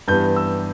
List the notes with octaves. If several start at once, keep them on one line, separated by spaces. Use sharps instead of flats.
G2 E3 G3 B3 G6
E6